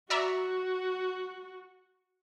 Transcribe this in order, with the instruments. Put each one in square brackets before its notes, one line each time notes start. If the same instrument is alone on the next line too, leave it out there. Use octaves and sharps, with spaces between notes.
[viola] F#4 [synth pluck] D5 E5 A#5